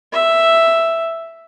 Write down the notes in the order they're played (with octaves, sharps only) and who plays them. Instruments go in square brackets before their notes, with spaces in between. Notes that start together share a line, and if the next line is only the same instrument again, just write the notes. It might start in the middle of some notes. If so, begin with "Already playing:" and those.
[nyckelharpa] E5